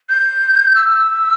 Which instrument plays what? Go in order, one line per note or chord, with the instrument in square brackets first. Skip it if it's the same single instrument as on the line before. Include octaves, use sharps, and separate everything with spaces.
[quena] G6
E6